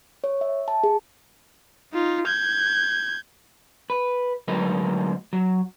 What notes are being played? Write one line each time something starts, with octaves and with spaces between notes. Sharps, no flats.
C#5
E5
A5
G#4
D#4 F4
G6 G#6
B4
D2 F#3 G#3 D#4 A#4 B4
F#3